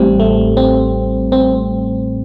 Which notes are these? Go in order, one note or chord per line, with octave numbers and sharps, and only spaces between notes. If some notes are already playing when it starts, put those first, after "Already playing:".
Already playing: A1 A2 G3 C4
A3
C4
C4